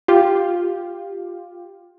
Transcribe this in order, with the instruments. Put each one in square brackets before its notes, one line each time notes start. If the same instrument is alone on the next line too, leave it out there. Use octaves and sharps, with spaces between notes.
[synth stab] F4 G4